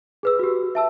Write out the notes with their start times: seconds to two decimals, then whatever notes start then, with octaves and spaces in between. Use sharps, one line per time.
0.23 G#4 B4 E6
0.39 F#4 G4
0.75 E5 A5 E6